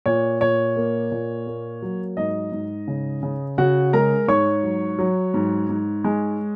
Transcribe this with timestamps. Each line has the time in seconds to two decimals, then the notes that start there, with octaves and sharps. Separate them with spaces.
0.06 A#2 C#5
0.41 A#2 C#5
0.76 A#3
1.12 A#2
1.47 A#3
1.82 F#3
2.17 G#2 D#5
2.52 G#2
2.88 C#3
3.23 C#3
3.58 C#3 F#4 F#5
3.93 G#3 A#4 A#5
4.28 G#2 C#5 C#6
4.63 F#3
4.99 F#3
5.34 G#2
5.69 G#2
6.04 G#3